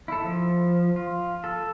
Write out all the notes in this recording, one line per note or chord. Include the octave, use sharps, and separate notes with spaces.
E4 A4
F3
F4
A4